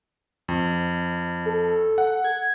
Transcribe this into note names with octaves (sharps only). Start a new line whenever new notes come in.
F2
A4
F#5
G#6